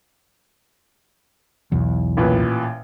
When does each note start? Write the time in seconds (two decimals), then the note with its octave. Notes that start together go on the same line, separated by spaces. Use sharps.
1.72 B1 E2
2.17 A1 A#2 B4